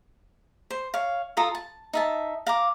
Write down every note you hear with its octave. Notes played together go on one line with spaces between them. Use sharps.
C5
C#5 F5
F4 A4 A#5 D#6
A5
D#4 E5 A5
F5 A#5 D6